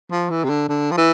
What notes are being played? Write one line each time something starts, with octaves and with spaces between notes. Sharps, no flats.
F3
E3
C3
D3
D3
F3
E3